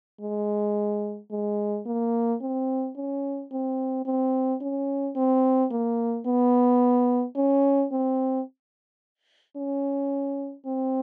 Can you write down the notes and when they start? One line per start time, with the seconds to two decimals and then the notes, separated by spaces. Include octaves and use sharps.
0.21 G#3
1.31 G#3
1.86 A#3
2.41 C4
2.96 C#4
3.52 C4
4.06 C4
4.61 C#4
5.16 C4
5.72 A#3
6.26 B3
7.36 C#4
7.92 C4
9.56 C#4
10.66 C4